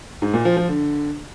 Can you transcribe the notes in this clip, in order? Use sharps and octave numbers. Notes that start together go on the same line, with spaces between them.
G#2
A#2
F3
F3
D3